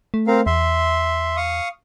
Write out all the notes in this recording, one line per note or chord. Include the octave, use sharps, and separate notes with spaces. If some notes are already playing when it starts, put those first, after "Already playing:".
A3
C4 A#4 F5
E2 E5 C6
F5 C#6 D#6